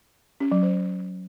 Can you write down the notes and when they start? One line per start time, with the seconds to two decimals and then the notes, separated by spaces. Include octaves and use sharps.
0.40 C#4
0.52 F#3
0.63 C5